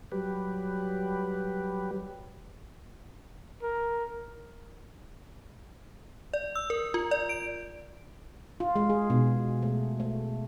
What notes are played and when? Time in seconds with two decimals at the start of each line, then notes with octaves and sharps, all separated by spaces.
0.12 F#3 G3 G4 B4
3.62 A#4
6.33 D5
6.56 E6
6.70 A#4
6.94 F4
7.11 D5
7.29 D7
8.60 F4
8.76 G#3
8.90 G#4
9.10 B2
9.62 A3
10.00 A3